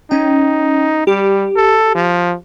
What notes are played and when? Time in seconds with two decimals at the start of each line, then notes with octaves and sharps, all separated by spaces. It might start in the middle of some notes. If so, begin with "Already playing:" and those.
0.11 C#4 D#4 G5
1.07 G3 G4
1.56 A4
1.95 F3